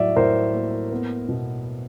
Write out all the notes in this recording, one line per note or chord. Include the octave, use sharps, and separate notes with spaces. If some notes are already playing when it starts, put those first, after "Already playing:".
Already playing: A2 F#3 D5 E5
A2 A#4 C5
A#3
B3
B2